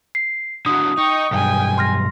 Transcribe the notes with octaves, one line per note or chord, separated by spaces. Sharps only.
C7
D3 F#3 D#6
D#4 G5 C#6 D#6
B1 G2 G5 G#5
C6 F6 A#6